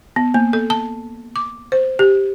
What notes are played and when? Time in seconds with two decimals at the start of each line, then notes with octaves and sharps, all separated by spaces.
0.16 B3
0.34 A#3
0.53 A4
0.70 A5
1.36 D6
1.72 C5
1.99 G4